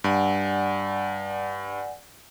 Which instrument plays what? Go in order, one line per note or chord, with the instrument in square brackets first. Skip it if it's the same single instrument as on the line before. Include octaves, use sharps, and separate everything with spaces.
[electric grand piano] G2 [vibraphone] D5 F#5 G#5